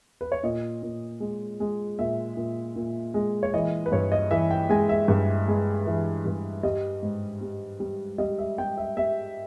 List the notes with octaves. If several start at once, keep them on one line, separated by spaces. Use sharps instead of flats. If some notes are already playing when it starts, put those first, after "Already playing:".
B4
C#5
A#2 D#5
A#2
G#3
G#3
A#2 E5
A#2
A#2
G#3
C#5
E3 D#5
B4
G2 C#5
D#5
E3 E5
G5
G#3 G#5
E5
G2
G#3
E3
G2
G3 D#5
G#2
G3
G3
G3 D#5
E5
G3 G5
E5
G3 E5